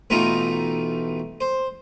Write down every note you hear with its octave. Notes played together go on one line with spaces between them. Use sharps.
A1 B2 A3 D#4 F4 A#5
C5